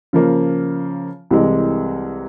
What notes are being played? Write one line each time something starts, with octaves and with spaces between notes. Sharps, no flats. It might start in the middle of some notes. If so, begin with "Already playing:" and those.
C#3 F3 A#3
C2 C3 E3 G#3